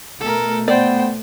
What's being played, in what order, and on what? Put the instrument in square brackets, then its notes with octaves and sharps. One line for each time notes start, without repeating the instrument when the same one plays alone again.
[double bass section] B2 A3 [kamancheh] A4 A#4
[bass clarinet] B3 [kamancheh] C5 G5 [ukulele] D5